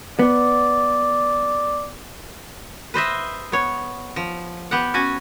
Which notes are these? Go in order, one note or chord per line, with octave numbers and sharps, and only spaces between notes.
B3 D5
B4 C5 D#5 E5
B3 C#5
F3
B3 G4 F#5
C#4 F#4 G#5